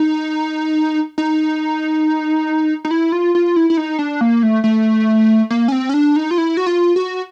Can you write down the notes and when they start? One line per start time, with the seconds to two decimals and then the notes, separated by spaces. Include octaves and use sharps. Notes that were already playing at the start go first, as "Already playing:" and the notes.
Already playing: D#4
1.18 D#4
2.85 D#4
2.91 E4
3.12 F4
3.35 F4
3.56 E4
3.70 E4
3.77 D#4
3.99 D4
4.21 A#3
4.43 A3
4.64 A3
5.50 A#3
5.68 C#4
5.72 C4
5.89 C#4
5.94 D4
6.16 D#4
6.31 F4
6.38 E4
6.57 F#4
6.66 F4
6.96 F#4